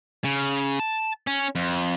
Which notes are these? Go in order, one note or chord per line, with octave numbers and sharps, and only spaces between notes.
C#3
A5
C#4
F2